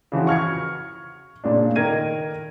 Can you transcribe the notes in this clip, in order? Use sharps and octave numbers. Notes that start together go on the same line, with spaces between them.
C#3 E3 F3 F#4
C#6 F6 G#6 C#7
A#2 C#3 D4
D#3 A#4 G#6 D#7